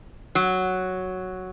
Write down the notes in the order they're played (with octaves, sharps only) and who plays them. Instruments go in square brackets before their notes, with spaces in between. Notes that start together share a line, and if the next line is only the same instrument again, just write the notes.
[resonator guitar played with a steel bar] F#3